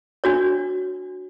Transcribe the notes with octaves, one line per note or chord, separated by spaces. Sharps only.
D4 F#4 C#5